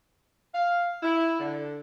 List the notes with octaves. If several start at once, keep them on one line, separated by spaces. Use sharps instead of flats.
F5
E4
D3